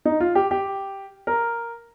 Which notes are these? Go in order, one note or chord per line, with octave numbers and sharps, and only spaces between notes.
D#4
F4
G4
G4
A#4